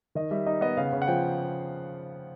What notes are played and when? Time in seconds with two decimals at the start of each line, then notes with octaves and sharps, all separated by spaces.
0.15 D#3 D#5
0.31 G3 E5
0.46 D#4 D#5
0.61 B3 D#5
0.77 C#3 F5
0.93 C#3
1.02 F#5
1.08 F3 G5